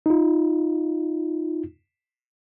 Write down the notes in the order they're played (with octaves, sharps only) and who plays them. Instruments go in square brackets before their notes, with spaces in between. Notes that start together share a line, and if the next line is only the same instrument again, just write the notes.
[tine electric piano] D#4 F4